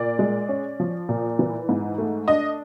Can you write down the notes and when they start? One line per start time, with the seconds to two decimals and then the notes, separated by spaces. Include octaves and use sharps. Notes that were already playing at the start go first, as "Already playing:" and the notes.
Already playing: A#2 D5
0.19 G#3
0.49 C#4
0.80 F3
1.09 A#2
1.39 E3
1.69 G#2
1.98 A3
2.28 D4 D#5